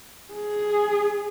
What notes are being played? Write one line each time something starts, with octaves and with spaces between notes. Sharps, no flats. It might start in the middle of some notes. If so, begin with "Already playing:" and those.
G#4